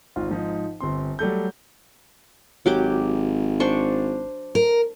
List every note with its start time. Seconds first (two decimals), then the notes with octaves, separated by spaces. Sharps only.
0.16 G#1 D#3 F4
0.29 G#2 F3 D#4
0.80 G1 C4 C6
1.19 F#3 G3 A3 G6
2.66 G#1 F#3 G4 D6
3.60 D4 C5 C#6
4.55 A#4